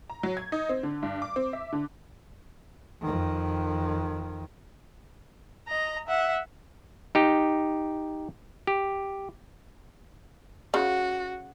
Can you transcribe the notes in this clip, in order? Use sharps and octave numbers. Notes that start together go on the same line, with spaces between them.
A#5
F#3
G#6
D#4
C4
D3
G2
D6
C4
E5
D3
F2 D#3
D#5 A#5
E5 F#5
D#4 G4
G4
C#3 F#4